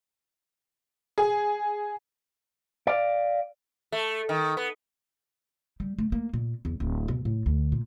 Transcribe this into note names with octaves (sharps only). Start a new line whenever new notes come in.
G#4
D5 F5
A3
D#3
B3
G3
A3
A#3
A#2
E2
D1
B2
A2
D2
A#2